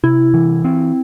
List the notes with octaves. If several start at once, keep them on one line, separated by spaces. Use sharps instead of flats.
C3 E4
E3
C4